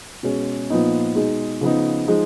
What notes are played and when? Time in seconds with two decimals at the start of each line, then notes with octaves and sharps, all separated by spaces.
0.23 B2 G#3 C#4
0.70 A#2 F3 B3 D#4
1.15 B2 G#3 D#4
1.61 C#3 F3 B3 D#4
2.08 F3 G#3 D#4